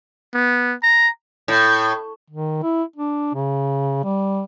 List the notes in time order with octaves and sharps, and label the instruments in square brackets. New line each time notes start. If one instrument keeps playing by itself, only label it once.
[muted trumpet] B3
A#5
[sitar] A2
[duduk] D#3
E4
D4
C#3
G3